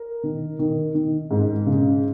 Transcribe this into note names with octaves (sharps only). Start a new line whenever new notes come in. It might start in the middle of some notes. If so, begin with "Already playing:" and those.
Already playing: A#4
D#3
D#3
D#3
G#2
C#3